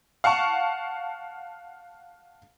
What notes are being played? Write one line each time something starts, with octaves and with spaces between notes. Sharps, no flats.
F5 F#5 A5 C#6